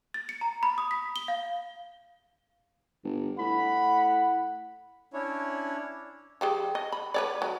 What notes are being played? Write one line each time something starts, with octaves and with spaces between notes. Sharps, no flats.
A6
C#7
A#5
B5
D#6
B6
G7
F5
G1
A2 F#5 B5
C#4 D4 E4 C#5
F3 G4 G#4
D#5
B5
B4 C#5 D5
F#3